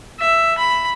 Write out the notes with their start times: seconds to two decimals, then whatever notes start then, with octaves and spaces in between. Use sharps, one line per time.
0.19 E5
0.58 B5